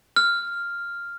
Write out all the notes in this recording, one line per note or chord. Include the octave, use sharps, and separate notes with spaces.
F6